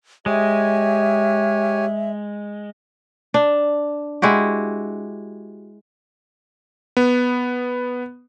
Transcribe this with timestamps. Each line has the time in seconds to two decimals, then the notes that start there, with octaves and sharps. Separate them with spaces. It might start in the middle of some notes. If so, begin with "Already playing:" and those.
0.26 G#3 G4 C#5 E5 G#5
3.34 D4
4.22 G#3 E4 F#4 G4
6.97 B3